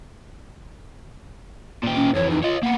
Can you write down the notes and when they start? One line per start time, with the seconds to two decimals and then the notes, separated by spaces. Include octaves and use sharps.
1.83 A#2 G4
1.95 C#4
2.15 F2 E3 C#5
2.30 D#4
2.43 F4 C#5 D#5
2.63 A#3 B3 F#5